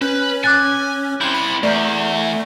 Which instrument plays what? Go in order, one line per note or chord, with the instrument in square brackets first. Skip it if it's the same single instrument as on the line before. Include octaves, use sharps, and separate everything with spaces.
[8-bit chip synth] C#4 [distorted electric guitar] B4 [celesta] G6
[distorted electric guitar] G#5 [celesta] D6 F#6 A6
[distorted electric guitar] C4 E4 [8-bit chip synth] G6
[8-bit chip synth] B5
[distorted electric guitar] E2 [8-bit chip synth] A3 [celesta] D5 A#5 G6